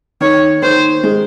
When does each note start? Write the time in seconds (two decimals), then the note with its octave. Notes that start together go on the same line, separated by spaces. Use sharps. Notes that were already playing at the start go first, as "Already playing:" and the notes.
0.21 D#3 C#5
0.62 D#3 C5
1.03 G#3